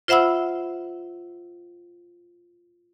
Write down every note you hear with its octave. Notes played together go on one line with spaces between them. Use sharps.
F4 C5 E5 F#5 B5 E6